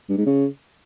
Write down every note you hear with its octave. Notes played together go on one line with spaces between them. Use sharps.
G2
G#2
C#3